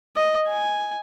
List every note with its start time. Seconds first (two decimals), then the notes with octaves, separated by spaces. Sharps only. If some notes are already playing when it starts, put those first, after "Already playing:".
0.16 D#5
0.48 G#5